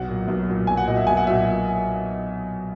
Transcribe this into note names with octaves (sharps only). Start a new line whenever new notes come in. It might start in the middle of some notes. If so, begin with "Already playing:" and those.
Already playing: B1 F#5
A#2 F#3
B1
A#2 F#3
B1 G#5
F#5
A#2 F#3 D#5
E5
B1 G#5
F#5
A#2 F#3 E5